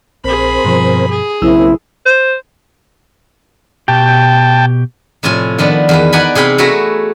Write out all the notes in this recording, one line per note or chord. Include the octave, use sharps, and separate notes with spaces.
A#1 C4 G#4 A#4 C5 B5
G2 B2 F3
G#4
B1 C#3 F#3 A#3 C4 E4 E6
C5
B2 G4 G5 A5
A2 C3 F3 F4 G#5
D#3 F3 B3 D4
E2 D#3 B4
B3 D#4 D5 F#5 G#5 B5
C3 G#4 F5 G5 B5
A3 F#4 G#4 B4 E5 A#5